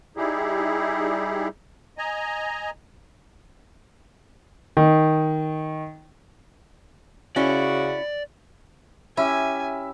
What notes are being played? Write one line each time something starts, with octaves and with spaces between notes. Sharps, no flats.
G3 D#4 E4 G4 G#4
D#5 G#5 A#5
D#3
C#3 C#4 E4 F#4 D5
C#4 E4 G4 E5 G#5